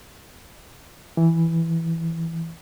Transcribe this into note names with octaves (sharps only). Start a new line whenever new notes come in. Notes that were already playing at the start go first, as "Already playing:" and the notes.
E3